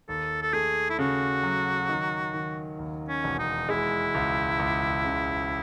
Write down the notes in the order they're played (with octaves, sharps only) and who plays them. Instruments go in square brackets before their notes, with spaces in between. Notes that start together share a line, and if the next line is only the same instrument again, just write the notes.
[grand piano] D#2 [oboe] A4
[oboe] A4
[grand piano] A3 [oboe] G#4
[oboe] E4
[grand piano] C#3 [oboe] F#4
[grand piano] F#3
D#3
D#3
D#2
[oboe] C#4
[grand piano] E1
[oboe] D#4
[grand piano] G#3 [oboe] E4
[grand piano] C#2
C#2
C#3